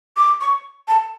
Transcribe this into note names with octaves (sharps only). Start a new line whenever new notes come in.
D6
C#6
A5